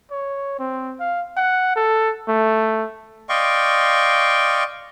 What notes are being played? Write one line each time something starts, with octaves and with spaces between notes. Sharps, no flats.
C#5
C4
F5
F#5
A4
A3
D5 D#5 F5 G5 C6 C#6